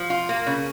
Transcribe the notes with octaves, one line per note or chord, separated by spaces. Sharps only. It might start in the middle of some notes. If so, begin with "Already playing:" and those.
Already playing: F3
F4
A#3
C#3